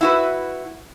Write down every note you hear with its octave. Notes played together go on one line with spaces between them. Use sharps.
E4 F#4 B4